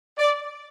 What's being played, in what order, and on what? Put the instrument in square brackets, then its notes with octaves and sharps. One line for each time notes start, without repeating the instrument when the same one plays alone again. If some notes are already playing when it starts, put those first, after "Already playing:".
[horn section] D5